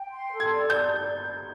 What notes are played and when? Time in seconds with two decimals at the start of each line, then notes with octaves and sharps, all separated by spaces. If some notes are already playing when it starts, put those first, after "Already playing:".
Already playing: G5
0.10 C6
0.32 A4
0.40 G#6
0.54 D5
0.70 G6